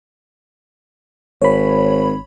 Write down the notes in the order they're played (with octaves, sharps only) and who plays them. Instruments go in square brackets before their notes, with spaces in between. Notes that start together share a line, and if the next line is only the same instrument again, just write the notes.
[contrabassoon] G#1 [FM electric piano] C#5 B5